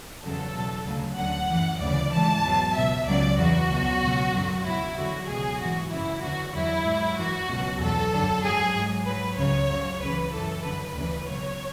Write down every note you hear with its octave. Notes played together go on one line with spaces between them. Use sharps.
E2 C#3 F#3 A4
E2 B2 F#3
D2 C#3 F#3
D2 D3 F#3 F#5
F#2 E3
D2 C#3 E3 D5
G#2 E3 A5
E2 B2 F#3
C#2 B2 F#3 E5
C#2 C#3 F#3 D5
E2 C#3 E3 F#4
C#2 B2 F#3
C#2 B2 F#3
F#2 D3 F#3
C#2 B2 F#3 E4
E2 D3 F#3 F#4
C#2 B2 F#3 G#4
G#2 E3 F#4
F#2 C#3 E3 E4
E2 D3 F#3 F#4
E2 D3 F#3 E4
G#2 F#3
F#2 E3 F#4
C#2 B2 F#3
E2 B2 F#3 A4
F#2 D3 F#3
G#2 F#3 G#4
G#2 F#3
G#2 F#3 B4
C#2 C#3 F#3 C#5
F#2 C#3 F#3
C#2 C#3 E3 B4
F#2 E3 A4
F#2 D3 F#3 B4
D2 C#3 E3
C#2 B2 F#3 C#5